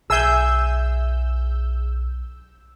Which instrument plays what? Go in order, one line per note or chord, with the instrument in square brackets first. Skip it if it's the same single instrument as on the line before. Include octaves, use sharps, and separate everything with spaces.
[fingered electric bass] B1 [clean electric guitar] G#4 E5 [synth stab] E6 G6